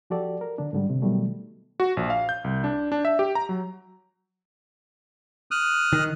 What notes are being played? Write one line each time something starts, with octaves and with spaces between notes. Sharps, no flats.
F3 F#4 G4 A4 D5
A#4
D3 D4
G#2 D3 G3
C3
B2 D#3 F#3 G3 A3
F#4
A#1
F5
G6
C2
D4
D4
E5
G4
A#5
F#3
D#6 F6 F#6
D#3